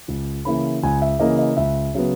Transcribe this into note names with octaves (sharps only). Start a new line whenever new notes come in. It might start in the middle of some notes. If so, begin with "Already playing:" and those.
C#2
C#3 E3 A#3 E4 B5
C#2 G#5
E5
C#3 E3 A#3 E4 D#5
D#5
C#2 E5
C#3 F#3 B3